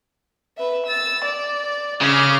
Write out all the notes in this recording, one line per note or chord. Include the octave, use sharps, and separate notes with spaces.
B4 E5
E6 A6
D5
C#3 D6 F6